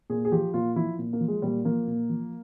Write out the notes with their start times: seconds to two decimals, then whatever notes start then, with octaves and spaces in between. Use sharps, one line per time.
0.10 A#2 G#4
0.25 G#4
0.32 F3 G4
0.54 A#2 F4
0.76 F3 E4
0.99 A#2
1.13 A#3
1.21 F3
1.28 G#3
1.42 A#2 G3
1.65 F3 A#3
1.87 A#2
2.10 F3